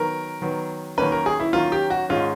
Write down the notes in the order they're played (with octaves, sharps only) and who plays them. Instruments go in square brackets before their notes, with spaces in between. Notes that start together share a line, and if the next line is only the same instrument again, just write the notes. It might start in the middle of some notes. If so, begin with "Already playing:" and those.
Already playing: [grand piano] D#3 F#3 B3 A#4
D#3 F#3 B3
D#3 F#3 A#3 C#4 B4
A#4
G#4
E4
D#3 F#3 A#3 C#4 F4
G4
F#4
G#2 D#3 G#3 C#4 F4